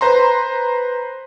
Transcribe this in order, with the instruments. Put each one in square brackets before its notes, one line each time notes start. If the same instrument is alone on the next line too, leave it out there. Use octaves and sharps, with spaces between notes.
[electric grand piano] B4 C5 A#5 C6